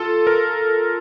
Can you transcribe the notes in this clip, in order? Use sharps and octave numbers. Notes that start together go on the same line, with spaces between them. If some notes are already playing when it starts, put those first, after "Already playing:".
Already playing: F4 A4
A#4